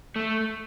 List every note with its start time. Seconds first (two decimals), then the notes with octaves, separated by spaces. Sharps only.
0.16 A3